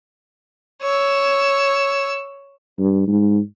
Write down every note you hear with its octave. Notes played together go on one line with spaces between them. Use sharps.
C#5 E6
G2
G#2